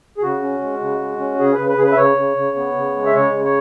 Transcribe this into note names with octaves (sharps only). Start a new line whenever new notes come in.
G#4
C#3 F#4
C#4
G#3
C#3
G#3
C#4
C#3 G#4
B4
C#3
B4
C#3 G#4
B4
E5
C#3 C#5
C#3
C#3
B3
C#3
G#3
E5
C#3 C#5
C#3
C#5